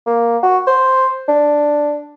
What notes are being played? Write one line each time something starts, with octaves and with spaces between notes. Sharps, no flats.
A#3
F#4
C5
D4